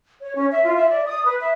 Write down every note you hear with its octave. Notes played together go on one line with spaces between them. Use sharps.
C#5
C#4
E5
F4
E5
D5
D#6
B4
E5